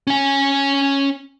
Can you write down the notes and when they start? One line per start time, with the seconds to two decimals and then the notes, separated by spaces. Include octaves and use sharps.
0.07 C#4 G#5